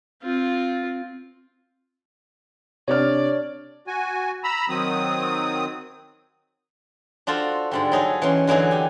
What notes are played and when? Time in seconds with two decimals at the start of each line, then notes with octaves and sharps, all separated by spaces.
0.23 C4 F4
2.88 C3 D4 C#5 D5 F6
3.87 F#4 G#5
4.44 A#5 B5 E6
4.69 D#3 F#3 C4 D#6
7.27 D4 F4 F#4 A4 C5
7.71 G#2 D3 G3
7.92 F#3 D#4 G#4 A4
8.22 E3 C#4 C6
8.47 D3 E3 F#3 D#4 G#4
8.71 G4 G#5